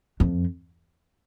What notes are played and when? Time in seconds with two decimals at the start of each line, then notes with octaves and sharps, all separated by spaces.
0.20 F2